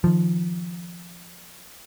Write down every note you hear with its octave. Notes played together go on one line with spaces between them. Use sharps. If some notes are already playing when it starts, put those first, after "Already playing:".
D#3 F3